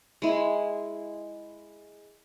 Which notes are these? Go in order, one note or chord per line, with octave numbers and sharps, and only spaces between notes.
G#3 E4